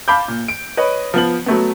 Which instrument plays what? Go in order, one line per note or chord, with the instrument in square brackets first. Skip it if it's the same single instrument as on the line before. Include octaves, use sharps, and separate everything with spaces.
[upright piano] F5 A5 B5 D6 G6
A#2
D7
B4 C#5 D#5
F3 B3 F#7
F#3 A3 B3